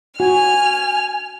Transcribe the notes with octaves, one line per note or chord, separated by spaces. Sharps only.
F#4 G#5 F6